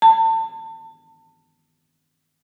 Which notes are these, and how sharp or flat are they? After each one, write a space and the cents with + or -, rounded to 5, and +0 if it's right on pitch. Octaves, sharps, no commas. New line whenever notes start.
A5 +30